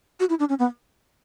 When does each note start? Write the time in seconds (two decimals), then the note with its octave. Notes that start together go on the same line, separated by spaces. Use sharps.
0.20 F#4
0.29 E4
0.40 D4
0.49 C#4
0.59 B3